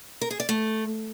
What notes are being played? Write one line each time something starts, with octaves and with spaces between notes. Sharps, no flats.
A#4
G#4
D5
A3